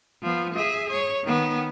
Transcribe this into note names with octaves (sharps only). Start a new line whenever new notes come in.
F3 B3
G#4 E5
C#5
D#3 B3